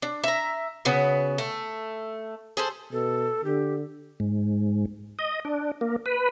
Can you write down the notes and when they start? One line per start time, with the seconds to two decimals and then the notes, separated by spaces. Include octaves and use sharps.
0.02 D4
0.24 E5 A#5
0.85 C#3 B3 F#4
1.38 A3
2.57 G#4 A4 C5
2.92 B2 A4
3.45 D3 G4
4.20 G#2
5.19 D#5
5.45 D4
5.81 A#3
6.06 B4